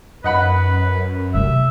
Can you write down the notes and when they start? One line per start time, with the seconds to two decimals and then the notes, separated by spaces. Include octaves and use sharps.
0.24 F#2 B4 D#5 F#5 B5
1.34 C3 A3 E5